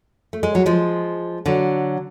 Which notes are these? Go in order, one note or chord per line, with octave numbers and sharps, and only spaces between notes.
A3
G#3
F#3
F3 G#3
D3 F#3